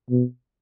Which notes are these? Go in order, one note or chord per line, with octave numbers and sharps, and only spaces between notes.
B2